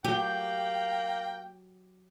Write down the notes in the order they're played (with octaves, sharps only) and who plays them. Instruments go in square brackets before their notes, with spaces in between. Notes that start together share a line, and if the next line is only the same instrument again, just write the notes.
[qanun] F#3 [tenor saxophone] A#3 [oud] G4 [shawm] G5